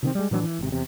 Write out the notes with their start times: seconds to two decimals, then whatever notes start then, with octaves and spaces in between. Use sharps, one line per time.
0.03 C3 D#3 C4
0.15 G3 G#3
0.31 A2 E3 F#3 D4
0.44 E3
0.59 G#1 C3
0.72 E2 C3